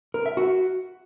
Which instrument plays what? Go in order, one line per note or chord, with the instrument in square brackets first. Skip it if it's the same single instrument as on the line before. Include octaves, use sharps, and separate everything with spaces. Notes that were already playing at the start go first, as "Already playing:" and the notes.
[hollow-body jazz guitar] A#4
E5
F#4